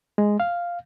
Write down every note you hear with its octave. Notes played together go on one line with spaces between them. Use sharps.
G#3
F5